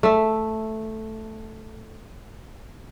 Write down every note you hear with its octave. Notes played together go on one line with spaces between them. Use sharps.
A3 E5